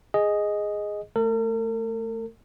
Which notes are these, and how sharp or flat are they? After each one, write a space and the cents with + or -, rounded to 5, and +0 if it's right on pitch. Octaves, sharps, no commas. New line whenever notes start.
G#4 +0 D#5 +0
A3 +0 A#4 -45